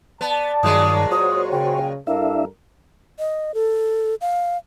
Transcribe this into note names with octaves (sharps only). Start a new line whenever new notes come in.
B3 D5 A5
G2 A#2 D#3 F#3 G#3 D#6
F#4 C5 C#5 D#6
C#3 G5
G2 D4 E4 A4 A#4 E5 F5
D#5
A4
F5